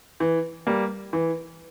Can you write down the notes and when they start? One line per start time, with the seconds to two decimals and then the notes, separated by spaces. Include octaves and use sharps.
0.20 E3
0.67 G3 A#3
1.13 E3